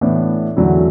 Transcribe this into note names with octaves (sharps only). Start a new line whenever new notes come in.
A2 E3 B3 D4
E2 D3 F#3 A3 E4